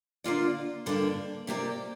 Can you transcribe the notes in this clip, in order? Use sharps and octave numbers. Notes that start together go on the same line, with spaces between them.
D3 A#3 F4 D5
G2 D3 A#3 D4
C3 A#3 G4 D5